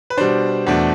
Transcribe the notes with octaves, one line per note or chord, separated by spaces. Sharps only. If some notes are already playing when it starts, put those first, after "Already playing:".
B4
B2 G3 D4 C5
E2 B2 A3 D4